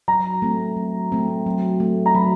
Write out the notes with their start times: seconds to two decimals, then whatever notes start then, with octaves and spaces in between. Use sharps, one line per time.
0.08 F#3 A#5
0.42 A3 C4
0.77 F#3
1.12 A3 C4
1.46 F#3
1.80 A3 C4
2.06 A#5
2.15 F#3 B5